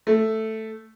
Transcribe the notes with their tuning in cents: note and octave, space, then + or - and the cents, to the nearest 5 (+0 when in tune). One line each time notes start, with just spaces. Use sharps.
A3 +0